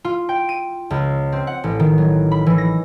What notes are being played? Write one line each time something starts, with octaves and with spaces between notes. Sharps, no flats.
F4
G5
D#7
C#2
C4
F#5
A1
D#3
F#3
B5
E3
A#6